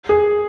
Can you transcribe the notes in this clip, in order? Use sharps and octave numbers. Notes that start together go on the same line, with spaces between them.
G#4